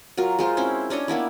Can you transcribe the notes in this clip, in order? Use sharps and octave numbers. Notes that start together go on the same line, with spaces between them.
F#3 F4 A#4
G#3 F4 C5
C4 C#4 E4 C5
C#4 D4 C#5 D#5
A#3 B3 D4 E4